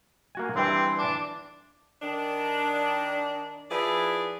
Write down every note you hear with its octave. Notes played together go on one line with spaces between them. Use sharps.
A#3 F#4 G#5
G2 E3 C4
D4
D#3 D4
F3 E4 G#4 B4 D5